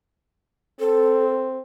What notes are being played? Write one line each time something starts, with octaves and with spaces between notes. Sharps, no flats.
C4 A4